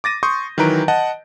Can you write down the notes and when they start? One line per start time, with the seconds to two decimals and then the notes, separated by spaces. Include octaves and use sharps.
0.04 D6 A6 A#6 D#7
0.23 C6 C#6 D#6 G6
0.58 D#3 E3 F#3 B4 A#5 D7
0.88 D#5 F#5 A5